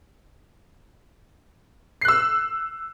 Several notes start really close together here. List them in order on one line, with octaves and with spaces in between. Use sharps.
C7 F#6 E6